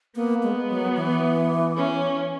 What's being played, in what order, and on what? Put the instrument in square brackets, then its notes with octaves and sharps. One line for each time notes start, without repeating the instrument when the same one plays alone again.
[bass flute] A#3 [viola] B3
[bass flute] G#3
F#3
E3
[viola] C#4